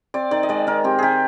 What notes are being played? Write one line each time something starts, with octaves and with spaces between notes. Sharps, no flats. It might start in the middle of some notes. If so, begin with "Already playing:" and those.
C4 D5
D#3 D5
D#5
G#3 D5
D#3 A#4
C4 G4
D#3 G4 G#4